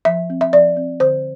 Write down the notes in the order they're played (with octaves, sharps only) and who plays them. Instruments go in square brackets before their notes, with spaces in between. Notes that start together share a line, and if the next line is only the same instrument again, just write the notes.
[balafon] F3 E5
C4
E5
F3 D5
C4
D3 C5